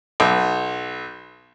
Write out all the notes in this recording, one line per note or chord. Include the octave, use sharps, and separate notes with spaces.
B1